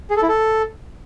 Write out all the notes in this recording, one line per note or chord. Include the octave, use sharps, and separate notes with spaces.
G#4
A4
E4
A4